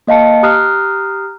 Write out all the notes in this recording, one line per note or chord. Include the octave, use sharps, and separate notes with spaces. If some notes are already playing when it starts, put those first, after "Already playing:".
A#3 D#5 F5 A5 C#7
G4 A#5 D#6 F6 F#6 C7